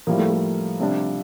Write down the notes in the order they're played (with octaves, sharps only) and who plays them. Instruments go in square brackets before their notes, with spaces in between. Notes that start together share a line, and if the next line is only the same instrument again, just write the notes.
[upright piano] A2 G3 A#3 [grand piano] F3
[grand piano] A3
A3
[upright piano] C3 G3 D4